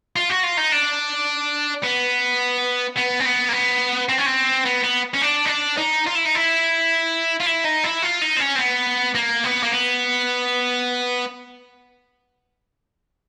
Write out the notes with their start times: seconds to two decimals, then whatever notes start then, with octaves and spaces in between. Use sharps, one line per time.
0.16 F4
0.30 F#4
0.43 F4
0.57 D#4
0.72 D4
1.84 B3
2.97 B3
3.20 C4
3.25 B3
3.49 A#3
3.52 B3
4.09 C4
4.18 C#4
4.26 C4
4.66 B3
4.84 B3
5.14 C#4
5.22 D4
5.45 D#4
5.49 D4
5.77 D#4
6.06 F4
6.15 E4
6.25 D#4
6.35 E4
7.41 F4
7.47 E4
7.65 D#4
7.84 E4
8.02 F4
8.21 D#4
8.37 C4
8.40 C#4
8.56 C4
8.59 B3
9.15 A#3
9.44 B3
9.63 A#3
9.72 B3